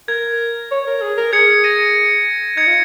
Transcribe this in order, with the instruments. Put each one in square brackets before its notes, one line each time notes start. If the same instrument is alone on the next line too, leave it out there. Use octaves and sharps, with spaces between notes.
[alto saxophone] A#4 [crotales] G#6
[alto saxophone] C#5
A#4
G#4
A#4
[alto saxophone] G#4 [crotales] G#6 C#7
[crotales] A#6 D#7
[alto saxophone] D#4 [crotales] G#6 C#7
[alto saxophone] F4